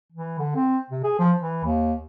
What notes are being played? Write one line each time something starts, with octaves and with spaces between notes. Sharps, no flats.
E3
D3
C4
C3
G#4
F3
E3
D#2